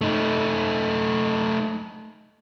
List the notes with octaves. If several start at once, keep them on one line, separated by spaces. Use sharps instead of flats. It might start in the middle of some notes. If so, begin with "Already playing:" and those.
A3 D#4